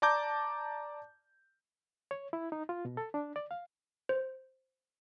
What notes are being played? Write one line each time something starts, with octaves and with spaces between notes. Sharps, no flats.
D5 A5 A#5 D6 G6
C#5
E4
D#4
F4
B2
A4
D4
D5
F5
C5